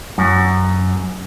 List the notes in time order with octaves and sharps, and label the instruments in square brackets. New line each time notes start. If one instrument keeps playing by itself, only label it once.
[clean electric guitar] F#2